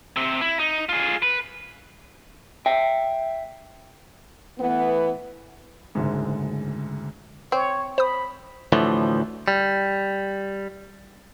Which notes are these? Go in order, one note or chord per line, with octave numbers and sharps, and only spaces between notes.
C3 C4
E4
D#4
F4 G#4
B4
E5 G5
E3 A3 B3
F#1 D2 G#2
C4 C#5
C5 B5 D#6
D2 A2 E3 F3
G3